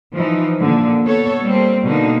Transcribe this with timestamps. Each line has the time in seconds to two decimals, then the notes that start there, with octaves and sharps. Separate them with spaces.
0.14 E3 F3 D#4
0.59 A#2 D3
1.05 B3 A4 C#5
1.43 G3 A#3 C4
1.86 B2 D3 A#3 D#4